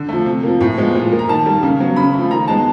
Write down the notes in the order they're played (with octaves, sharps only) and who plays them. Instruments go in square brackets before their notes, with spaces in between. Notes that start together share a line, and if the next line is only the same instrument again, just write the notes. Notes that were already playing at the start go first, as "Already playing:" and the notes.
Already playing: [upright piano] D3
F3 A3
C3
F3 A#3
A2
F3 G#3 B3
A#2
F3 A#3
A#5
D#3 A5
G3 A#3
C#3
F#3 B3
C#3 B5
F3 A3
D#3 A#5
G#3 B3 A5